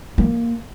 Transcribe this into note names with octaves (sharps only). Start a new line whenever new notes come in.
A#3